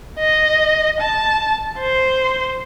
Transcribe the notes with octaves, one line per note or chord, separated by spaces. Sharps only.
D#5
A5
C5